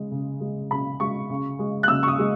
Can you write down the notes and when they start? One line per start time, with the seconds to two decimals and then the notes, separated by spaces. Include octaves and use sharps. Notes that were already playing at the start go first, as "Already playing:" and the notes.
Already playing: C#3 G#3
0.11 C#3
0.40 G#3
0.71 C#3 B5
1.00 G#3 C#6
1.30 C#3
1.59 G#3
1.83 F#6
1.88 C#3 E6
2.03 C#6
2.08 D#6
2.19 G#3